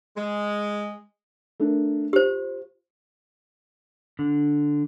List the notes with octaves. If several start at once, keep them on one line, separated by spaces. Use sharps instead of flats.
G#3
A3 D4 A#4
F4 G4 C5
D3